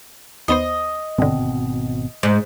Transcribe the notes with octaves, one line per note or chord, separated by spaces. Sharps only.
D#2 B3 C5 D#5
G#1 G2 B2 D3 C4
G#2